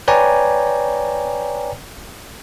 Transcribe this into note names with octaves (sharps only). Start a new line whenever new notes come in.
B4 C#5 D5 G5 G#5 A#5